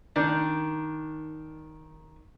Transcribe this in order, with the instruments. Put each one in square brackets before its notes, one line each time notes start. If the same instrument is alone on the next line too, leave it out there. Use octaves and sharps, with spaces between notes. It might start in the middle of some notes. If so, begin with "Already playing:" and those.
[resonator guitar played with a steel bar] D#3 [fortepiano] D4